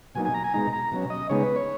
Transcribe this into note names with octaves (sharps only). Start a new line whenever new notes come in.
B2 F#3 A#3 D#4 G#5
G#5
A#5
G#5
B2 G#3 D#4 A#5
A#5
B2 F#3 C#4
D#5
C#3 G#3 B3 D#4 C#5
B4
C#5